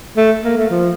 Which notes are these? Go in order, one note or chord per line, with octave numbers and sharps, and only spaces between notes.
A3
A#3
A3
F3